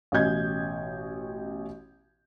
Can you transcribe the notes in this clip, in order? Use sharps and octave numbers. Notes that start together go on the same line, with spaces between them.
A1 B2 C#4 D#5 G6 G#6